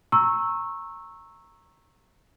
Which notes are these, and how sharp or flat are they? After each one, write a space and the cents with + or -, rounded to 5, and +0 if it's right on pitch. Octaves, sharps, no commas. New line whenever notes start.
A#5 -10 C#6 -20 E6 +0